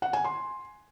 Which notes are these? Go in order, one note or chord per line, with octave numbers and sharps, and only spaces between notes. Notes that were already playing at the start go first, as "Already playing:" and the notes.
F#5
G#5
C6